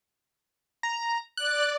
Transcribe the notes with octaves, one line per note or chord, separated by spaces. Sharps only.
A#5
D5 F#6